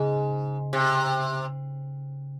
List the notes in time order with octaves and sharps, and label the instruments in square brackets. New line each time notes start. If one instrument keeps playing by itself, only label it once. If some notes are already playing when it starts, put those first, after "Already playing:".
Already playing: [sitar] G#2 [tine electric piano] C#3
[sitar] C3